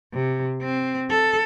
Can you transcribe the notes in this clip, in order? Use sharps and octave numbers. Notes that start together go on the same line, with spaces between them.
C3
C4
A4